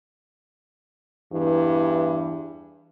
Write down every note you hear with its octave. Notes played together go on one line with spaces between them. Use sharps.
E2 G2 E3